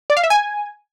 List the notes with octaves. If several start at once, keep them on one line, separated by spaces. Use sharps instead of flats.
D5
F5
E5
G#5